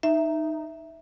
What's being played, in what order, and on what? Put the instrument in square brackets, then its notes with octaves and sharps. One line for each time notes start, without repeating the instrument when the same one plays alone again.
[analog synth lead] D#4 [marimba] E5